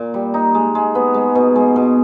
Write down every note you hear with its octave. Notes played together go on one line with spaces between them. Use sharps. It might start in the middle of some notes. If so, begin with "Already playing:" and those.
Already playing: A#2
G3
D#4
G#3
G#3
B3
G#3
B2
G#3
B2